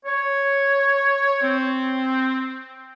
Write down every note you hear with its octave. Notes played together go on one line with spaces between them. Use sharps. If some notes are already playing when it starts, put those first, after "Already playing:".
C#5
C4